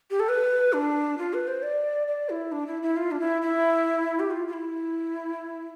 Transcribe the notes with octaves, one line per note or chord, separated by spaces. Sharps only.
G4
A4
B4
D4
F4
B4
C5
D5
D5
E4
D4
E4
E4
F4
D4
E4
E4
G4
F4
F4
E4